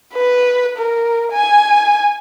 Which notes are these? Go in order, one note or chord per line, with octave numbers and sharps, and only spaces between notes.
B4
A#4
G#5